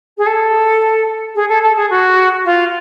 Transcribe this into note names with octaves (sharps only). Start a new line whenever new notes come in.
G#4
A4
G#4
A4
A4
G#4
F#4
F4